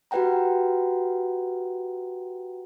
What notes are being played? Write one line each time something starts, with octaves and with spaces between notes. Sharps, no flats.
F#4 G4 B4 F#5 G5 A#5